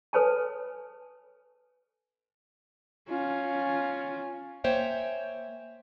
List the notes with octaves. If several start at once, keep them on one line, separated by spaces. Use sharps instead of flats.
A4 B4 C#5 G#5 A5
C#4 F4
A#3 C5 C#5 E5 G5 G#5